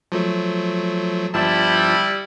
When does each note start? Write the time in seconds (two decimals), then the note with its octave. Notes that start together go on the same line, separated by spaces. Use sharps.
0.12 F3 F#3 A3
1.34 G1 F3 G3 E4 A5